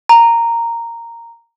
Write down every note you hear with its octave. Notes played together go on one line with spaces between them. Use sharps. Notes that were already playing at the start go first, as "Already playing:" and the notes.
A#5